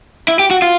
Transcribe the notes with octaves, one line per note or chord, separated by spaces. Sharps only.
E4
G4
F#4
F4